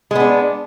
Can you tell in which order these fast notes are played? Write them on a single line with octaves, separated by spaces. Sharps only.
G#3 B3 D4